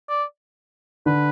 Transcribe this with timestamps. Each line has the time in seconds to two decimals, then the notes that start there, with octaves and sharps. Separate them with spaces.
0.09 D5
1.06 D3 B4